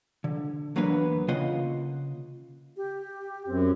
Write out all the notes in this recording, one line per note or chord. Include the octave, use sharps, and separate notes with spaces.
D3
E2 F#3 A#3 B3 D4 B4
C#3 A#3 F4 D#5 F#5
G4
F#2 C4